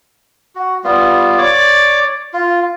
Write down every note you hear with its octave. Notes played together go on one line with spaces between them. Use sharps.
F#4
G3 B3 F4
C#5 D5 D6
F4